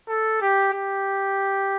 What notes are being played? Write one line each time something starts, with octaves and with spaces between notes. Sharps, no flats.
A4
G4
G4